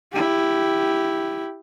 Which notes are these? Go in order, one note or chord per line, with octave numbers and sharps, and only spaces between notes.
E4 G4